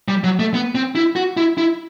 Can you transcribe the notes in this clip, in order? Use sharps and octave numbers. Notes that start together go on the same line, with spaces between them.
G3
F#3
A3
B3
C4
E4
F#4
E4
E4